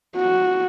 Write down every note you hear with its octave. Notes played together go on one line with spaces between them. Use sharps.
F#4